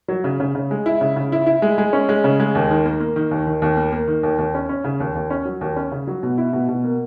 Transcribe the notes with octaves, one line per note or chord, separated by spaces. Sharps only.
F#3
C#3
C#3
C#3
G#3
E4
C#3
C#3
E4
E4
G#3
G#3
C#4
G#3
C#3
G#3
D#2
D#3
A#3
A#3
D#3
D#2
D#3
D#2
A#3
A#3
D#3
D#2
D#2
C#4
C#4
C#3
D#2
D#2
C#4
F#3
D#2
C#4
C#3
F#3
B2
E4
B2
B2
A#3